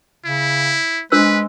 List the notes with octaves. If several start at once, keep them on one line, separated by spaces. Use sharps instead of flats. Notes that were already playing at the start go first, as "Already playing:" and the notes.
C#3 E4
G#3 D4 B4 C5 E6